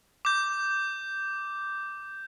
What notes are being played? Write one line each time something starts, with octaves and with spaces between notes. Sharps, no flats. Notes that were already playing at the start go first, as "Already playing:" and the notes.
D6 G6